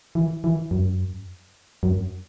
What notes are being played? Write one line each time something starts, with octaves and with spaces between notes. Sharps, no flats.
E3
E3
F#2
F#2